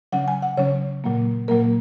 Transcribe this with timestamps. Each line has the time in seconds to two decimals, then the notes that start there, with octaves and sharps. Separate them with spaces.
0.12 C#3 F#3 C#4 F#5
0.28 G#5
0.42 F#5
0.57 C#3 F#3 C#4 C#5
1.04 A#2 F#3 A#3
1.48 A#2 F#3 A#3 A#4